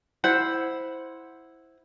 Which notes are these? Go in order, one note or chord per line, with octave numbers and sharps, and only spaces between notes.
E4 C5 F#5